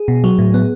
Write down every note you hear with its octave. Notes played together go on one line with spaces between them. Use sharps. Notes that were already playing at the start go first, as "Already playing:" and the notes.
Already playing: G#4
B2
F#3
A2
B3